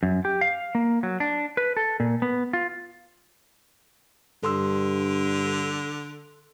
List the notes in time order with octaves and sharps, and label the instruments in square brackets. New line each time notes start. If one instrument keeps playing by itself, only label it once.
[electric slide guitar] F#2
G4
F5
A#3
F#3
D4
B4
A4
A#2
B3
F4
[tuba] G2 [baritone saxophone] D3 [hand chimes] A4 C6 E6